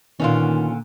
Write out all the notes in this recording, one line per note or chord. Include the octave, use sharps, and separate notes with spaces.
A#2 D3 D#3 B3 C#4 D#4 F4